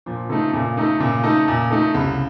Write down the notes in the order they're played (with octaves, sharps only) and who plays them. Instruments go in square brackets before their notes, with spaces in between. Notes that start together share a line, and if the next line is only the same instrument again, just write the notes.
[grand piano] A#2 [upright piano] F3
[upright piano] C#3 [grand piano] A3 D#4 A4
[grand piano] A#2 [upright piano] C#3
[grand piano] A3 D#4 A4
[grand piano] A#2 [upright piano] C#3
[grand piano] A3 D#4 A4
A#2
A3 D#4 A4
[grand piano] C2 [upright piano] C#3